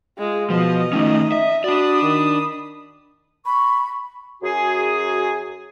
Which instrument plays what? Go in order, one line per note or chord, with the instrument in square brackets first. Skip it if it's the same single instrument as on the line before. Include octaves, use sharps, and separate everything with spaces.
[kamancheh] G#3 F4
[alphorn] B2 [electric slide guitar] F3 [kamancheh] D#5
[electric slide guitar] D#3 A3 C#4 [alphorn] D#4
[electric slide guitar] E5
[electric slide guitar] D4 D5 [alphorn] F#4 [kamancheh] B5 D#6
[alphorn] D#3
[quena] B5 [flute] C#6
[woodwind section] F#2 F#4 G#4